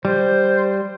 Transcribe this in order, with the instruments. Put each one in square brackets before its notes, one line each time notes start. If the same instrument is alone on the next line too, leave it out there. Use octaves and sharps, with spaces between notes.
[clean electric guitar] G3 [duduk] C5